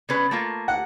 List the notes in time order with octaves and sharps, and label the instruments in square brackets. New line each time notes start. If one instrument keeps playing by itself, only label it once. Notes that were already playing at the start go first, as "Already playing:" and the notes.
[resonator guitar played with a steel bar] C#3 C#4 B4
A3 A#3 F4
[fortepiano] F#5